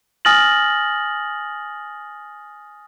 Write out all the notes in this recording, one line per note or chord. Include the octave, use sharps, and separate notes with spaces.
G#5 D#6 F6 A6 A#6 F#7